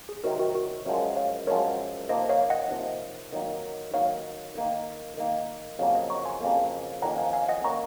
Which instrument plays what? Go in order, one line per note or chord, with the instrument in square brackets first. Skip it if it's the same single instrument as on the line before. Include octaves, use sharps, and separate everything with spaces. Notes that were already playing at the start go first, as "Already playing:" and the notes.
[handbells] G#4
[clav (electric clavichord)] C3 D#3 F#3 C4 D#4 [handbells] F#4 A#4
[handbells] F#4 A#4
F#4 A#4
[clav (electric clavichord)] F#2 F3 G#3 [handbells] A#4 C#5
[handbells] C#5 F5
[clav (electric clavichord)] F#2 F3 G#3 [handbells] A#4 C#5
[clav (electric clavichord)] C3 F3 A#3 D#4 [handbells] C5 D#5
[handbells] C#5 F5
D#5 F#5
[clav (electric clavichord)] C3 F3 A#3 D#4
D#3 F#3 A#3 D#4
[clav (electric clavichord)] D#3 F#3 A#3 D#4 [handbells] C#5 F5
[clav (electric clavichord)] D#3 A#3 D#4
D#3 A#3 D#4
[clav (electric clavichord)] F2 C#3 F#3 A#3 [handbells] C#5 F5
[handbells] D#5 F#5
A#5 C#6
G#5 C6
[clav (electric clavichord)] F2 C#3 F#3 A#3
[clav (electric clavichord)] F2 D#3 A#3 C#4 [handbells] F#5 A#5
[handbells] F5 G#5
F5 G#5
D#5 F#5
[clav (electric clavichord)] D#3 A#3 C#4 [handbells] A#5 C#6